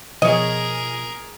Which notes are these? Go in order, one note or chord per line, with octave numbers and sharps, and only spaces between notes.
B2 F3 G#4 A#4 C#5 D#5